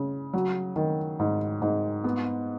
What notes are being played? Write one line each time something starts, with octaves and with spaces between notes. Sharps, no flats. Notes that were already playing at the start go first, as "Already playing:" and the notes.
Already playing: C#3
F#3
D#3
G#2
G#2
B3